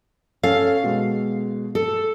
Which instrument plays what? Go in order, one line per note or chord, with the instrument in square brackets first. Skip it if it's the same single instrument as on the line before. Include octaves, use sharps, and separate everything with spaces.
[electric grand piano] C#4 A4 [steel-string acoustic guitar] F5
[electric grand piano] B2 G#3
[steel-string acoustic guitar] A4